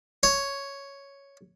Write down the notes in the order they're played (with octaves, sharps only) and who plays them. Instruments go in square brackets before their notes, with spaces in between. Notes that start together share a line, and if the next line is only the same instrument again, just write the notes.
[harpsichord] C#5